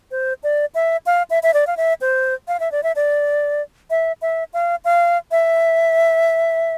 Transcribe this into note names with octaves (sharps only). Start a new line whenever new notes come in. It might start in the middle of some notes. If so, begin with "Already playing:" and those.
C5
D5
E5
F5
E5
E5
D5
F5
E5
C5
F5
E5
D5
E5
D5
E5
E5
F5
F5
E5